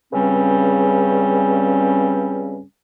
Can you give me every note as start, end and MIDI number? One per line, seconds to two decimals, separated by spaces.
0.13 2.62 37
0.13 2.62 43
0.13 2.62 49
0.13 2.62 55
0.13 2.62 60
0.13 2.62 61